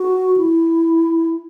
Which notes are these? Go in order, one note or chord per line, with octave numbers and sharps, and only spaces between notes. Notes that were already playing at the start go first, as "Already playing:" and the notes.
Already playing: F#4
E4